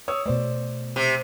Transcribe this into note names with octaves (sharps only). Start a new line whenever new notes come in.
C#5 D#6 E6
B2 A3 C5 D5
C3